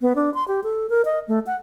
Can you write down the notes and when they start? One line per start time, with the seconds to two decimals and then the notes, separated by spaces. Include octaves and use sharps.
0.01 B3
0.16 D4
0.34 C6
0.48 G4
0.64 A4
0.90 A#4
1.05 D#5
1.28 A3
1.47 F#5